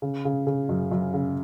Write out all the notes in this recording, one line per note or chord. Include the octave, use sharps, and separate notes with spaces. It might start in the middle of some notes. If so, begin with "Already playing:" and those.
C#3
C#3
C#3
F#2
F#2
C#3